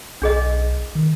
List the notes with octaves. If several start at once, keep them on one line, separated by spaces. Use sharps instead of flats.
B1 D4 G#4 D#5
D#3